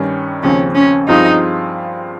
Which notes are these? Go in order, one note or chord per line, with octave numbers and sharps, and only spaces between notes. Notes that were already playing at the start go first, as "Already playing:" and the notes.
Already playing: G2 D#3 G3 C#4
D#2 C#3 F3 C4 C#4
C#4
G2 F3 C4 D#4 F4 G#4